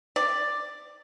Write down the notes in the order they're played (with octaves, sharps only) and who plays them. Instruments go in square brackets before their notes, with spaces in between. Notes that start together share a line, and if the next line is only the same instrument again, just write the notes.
[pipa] D5